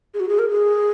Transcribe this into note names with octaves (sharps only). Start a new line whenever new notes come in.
G#4
F#4
G#4
A#4
G#4